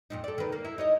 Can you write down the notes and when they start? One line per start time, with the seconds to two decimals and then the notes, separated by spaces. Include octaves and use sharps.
0.10 F2 A#2 D#4
0.24 A4 D5
0.38 D#3 B4
0.52 A#3
0.65 E4
0.78 D#4 C#5 D#5